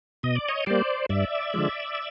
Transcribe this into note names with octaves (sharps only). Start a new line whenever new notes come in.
B2 D#5
D5
C#5 D#5
G3 A#3 C5 D5
G2 D5 E5
D3 F3 G#3